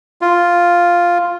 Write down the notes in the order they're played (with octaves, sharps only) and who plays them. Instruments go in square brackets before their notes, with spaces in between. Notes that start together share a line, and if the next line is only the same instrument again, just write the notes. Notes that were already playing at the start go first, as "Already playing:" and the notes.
[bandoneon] F4